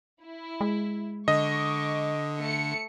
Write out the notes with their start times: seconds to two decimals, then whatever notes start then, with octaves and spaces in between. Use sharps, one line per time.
0.22 E4
0.61 G#3
1.28 D3 D#5 C#6 D6
2.40 A3 C#7